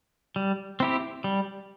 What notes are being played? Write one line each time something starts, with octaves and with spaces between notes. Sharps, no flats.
G3
C4 E4 G4
G3